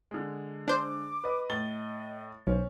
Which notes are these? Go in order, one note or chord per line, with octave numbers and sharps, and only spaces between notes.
D3 G#3
D4 C5 D6
B4 D#5
A2 D#5 A6 G7
B1 C#4 C5